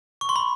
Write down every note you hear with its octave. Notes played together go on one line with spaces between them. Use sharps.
C#6
C6
B5